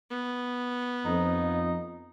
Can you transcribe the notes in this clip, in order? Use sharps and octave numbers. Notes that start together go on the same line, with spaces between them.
B3
F2 D#4